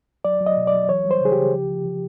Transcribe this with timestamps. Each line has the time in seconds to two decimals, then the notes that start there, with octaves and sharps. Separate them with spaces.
0.25 F#3 D5
0.41 F#3
0.46 D#5
0.57 B2
0.67 D5
0.73 F#3
0.89 E3 C#5
1.05 G3
1.11 C5
1.21 C#3 G#4
1.32 G4
1.37 C#3
1.53 F3
1.70 F3
1.85 F3